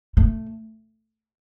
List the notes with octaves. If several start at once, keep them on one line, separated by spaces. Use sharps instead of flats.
A3